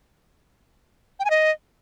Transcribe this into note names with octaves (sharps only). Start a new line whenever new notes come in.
G5
G#5
D#5